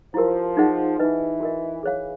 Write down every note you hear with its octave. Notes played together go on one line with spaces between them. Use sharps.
F3 E4 G4 A#4
D#4 G#4 C5 D#5 F#5
E3 D#4 G4 B4 D#5
F#4 A#4 D#5
E3 G#4 C#5 F5